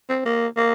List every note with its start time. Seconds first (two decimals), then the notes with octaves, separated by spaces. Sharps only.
0.09 C4
0.25 A#3
0.57 A#3